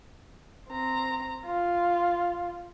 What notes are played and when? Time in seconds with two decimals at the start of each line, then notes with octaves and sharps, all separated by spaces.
0.69 C4 A#5
1.46 F4